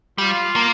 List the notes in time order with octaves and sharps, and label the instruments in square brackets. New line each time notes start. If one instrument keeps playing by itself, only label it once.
[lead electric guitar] G3 [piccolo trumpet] F4
[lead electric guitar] A#3